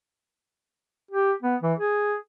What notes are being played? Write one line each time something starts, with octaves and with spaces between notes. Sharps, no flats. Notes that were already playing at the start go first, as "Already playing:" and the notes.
G4
B3
E3
G#4